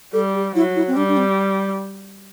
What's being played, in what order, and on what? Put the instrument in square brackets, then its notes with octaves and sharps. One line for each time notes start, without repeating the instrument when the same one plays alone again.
[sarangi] G3 [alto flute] A4
[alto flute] G4
[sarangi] F#3 [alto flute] E4
[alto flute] E4
C4
[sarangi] G3 [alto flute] D4
[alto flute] D4
C4